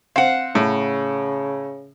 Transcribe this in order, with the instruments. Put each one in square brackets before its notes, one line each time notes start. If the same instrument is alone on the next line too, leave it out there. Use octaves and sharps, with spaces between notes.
[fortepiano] C4 [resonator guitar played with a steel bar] F5 F#5
[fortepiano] A2 [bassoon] C#3